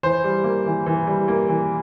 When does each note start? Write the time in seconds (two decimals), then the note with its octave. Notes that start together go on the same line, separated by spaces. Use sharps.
0.03 E3 C5
0.24 G3
0.44 A#3
0.66 E3
0.86 E3
1.07 G3
1.28 A#3
1.49 E3